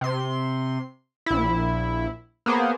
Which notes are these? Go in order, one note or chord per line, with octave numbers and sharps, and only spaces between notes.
C3 C6
A#1 E4
A#3 B3 G#4 C5